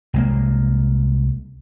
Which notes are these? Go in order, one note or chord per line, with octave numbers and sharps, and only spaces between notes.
C2 G#3 A#3